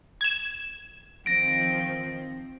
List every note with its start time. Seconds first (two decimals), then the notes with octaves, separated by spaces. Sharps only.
0.21 G#6 E7
1.26 D#3 F3 C4 A#6 D7